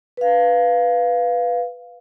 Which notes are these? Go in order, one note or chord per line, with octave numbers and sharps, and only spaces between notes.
B4 F5